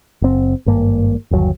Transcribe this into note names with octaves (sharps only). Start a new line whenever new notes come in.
F#1 C4
G#1 G2 A#3
G1 D#2 F#3